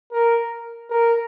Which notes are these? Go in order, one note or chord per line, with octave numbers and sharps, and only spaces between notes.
A#4
A#4